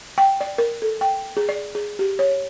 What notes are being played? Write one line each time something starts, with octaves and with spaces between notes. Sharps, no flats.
G5
D5
A#4
A4
G5
G#4
D5
G#4
G4
C#5